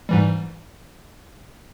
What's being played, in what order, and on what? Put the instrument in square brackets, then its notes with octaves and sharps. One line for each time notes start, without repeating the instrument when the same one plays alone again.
[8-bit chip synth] G#2 E3 G3